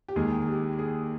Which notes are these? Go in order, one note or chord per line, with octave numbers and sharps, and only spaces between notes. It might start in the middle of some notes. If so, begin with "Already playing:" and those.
G4
D#2 D#3 G#3 G#4
G4
G#4